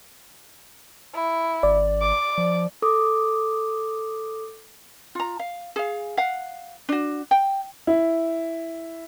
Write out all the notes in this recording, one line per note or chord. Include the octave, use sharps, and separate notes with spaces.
E4
G#1 D5
D6
F3
A4 D6 D#6
F4 A#5
F5
G#4 F5
F5 F#5
D4 F#4
G5
E4